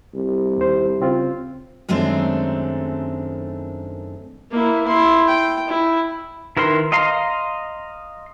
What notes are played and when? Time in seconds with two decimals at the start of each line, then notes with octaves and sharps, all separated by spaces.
0.15 C2
0.57 D#2 C5
1.00 C#3 C4 F4
1.89 F#2 D#3 G#3 A3 C4 D4
4.51 A#3 E4
4.86 E4 C6
5.28 G5
5.68 E4
6.57 D#3 E4 A#4 B4 C6
6.92 D#5 F5 A#5 C6